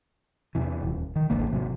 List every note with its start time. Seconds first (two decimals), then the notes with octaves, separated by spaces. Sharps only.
0.55 E2 C3 E3
0.83 D#1
1.16 D#3
1.30 D1 A1 D3 A#3
1.51 G#1 C3 F#3